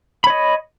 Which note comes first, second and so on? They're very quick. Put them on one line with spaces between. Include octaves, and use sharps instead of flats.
B5 C#5 D#5